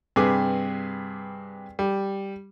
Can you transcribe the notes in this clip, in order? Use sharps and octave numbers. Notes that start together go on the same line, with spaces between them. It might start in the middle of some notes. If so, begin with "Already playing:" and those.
G2 C3 G#4 B4 D6
G3